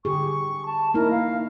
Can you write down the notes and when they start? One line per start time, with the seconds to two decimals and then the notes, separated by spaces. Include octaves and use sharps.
0.05 D3 G4 G#4 C#6
0.66 A5
0.94 A#3 D#4 E4 A#4
1.11 F5